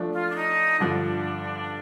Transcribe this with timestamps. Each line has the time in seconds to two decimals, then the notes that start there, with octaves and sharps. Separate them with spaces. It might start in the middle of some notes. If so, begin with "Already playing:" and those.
Already playing: F3 A3 D4
0.13 F4
0.30 D4
0.36 D#4
0.79 G2 D3 F3 D4